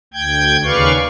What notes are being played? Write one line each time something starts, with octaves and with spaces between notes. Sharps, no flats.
D2 G5 G6 G#6
D#2 C#3 B4 D5 F5 C#6